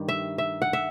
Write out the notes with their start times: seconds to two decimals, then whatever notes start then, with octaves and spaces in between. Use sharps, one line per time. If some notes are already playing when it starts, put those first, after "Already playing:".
Already playing: G2 D#3 G3
0.08 E5
0.38 E5
0.62 F#5
0.73 E5